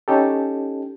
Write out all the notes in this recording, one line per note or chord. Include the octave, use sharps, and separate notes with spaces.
C#4 D#4 G4 A4